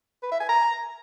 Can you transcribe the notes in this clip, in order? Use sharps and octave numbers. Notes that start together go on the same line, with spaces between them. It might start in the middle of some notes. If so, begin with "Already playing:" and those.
B4
E5
G#5
A#5